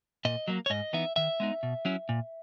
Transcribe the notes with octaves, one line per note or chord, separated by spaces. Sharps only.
A#2 D#5
F#3 A#3
C#5
G#2 D#5
E3 B3 D#4 E5
D#3 E5
G#3 B3 D#4
B2
F#3 C#4 E4
A#2